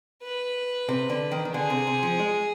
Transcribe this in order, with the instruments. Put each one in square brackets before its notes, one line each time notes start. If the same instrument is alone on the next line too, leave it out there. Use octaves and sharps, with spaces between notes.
[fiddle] B4
[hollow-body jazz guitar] C3
D3
D#3
D#3
[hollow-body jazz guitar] D3 [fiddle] G#4
[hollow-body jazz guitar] C3
C3
F3
G#3